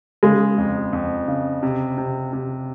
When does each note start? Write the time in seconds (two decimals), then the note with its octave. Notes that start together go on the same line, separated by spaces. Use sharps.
0.23 C#3 G#3
0.58 F2
0.93 F2
1.28 C#3
1.63 C3
1.98 C3
2.33 C3